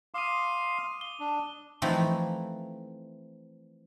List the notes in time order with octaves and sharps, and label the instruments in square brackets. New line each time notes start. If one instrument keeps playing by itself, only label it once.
[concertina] F5 C6 [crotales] D6 D#6 D#7
[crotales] G7
[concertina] D4
[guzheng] E3 F3 A3 C4 D#4